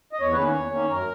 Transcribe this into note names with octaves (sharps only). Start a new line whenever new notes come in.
D#5
E2 C#5
B4
D#3 A#3 C#4
C#5
E2
D#3 A#3 C#4
F#2 A#4